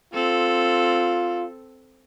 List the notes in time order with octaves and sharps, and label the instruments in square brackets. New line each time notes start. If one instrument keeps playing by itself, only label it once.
[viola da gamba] C4 A4 [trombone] F4